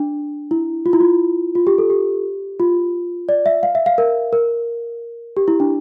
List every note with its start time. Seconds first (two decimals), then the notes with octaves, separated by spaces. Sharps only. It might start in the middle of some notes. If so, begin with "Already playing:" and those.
Already playing: D4
0.51 E4
0.86 F4
0.93 E4
1.00 F4
1.55 F4
1.67 G4
1.78 A4
1.90 G4
2.60 F4
3.29 D5
3.46 E5
3.63 F5
3.75 E5
3.86 F5
3.98 A#4
4.33 A#4
5.37 G4
5.48 E4
5.60 D4